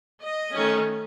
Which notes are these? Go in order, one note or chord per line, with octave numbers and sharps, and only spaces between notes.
D#5
D#3 A3 C#4